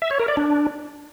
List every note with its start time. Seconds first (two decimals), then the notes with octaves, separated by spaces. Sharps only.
0.02 E5
0.11 C#5
0.19 A#4
0.28 D5
0.37 D4